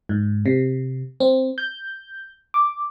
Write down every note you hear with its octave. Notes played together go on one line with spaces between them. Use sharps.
G#2
C3
C4
G6
D6